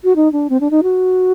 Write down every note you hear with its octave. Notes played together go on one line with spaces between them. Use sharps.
F#4
D#4
D4
C4
D4
D#4
F#4